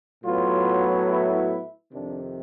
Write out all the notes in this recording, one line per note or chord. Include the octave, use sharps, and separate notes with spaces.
A2 F#3 B3 F4
E4
F2 C3 D#3 D4